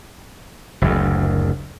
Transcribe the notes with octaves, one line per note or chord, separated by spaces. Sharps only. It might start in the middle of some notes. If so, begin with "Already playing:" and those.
F#1 D2